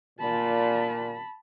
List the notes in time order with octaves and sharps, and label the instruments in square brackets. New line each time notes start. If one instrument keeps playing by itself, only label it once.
[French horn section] A#2 [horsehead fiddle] A5 B5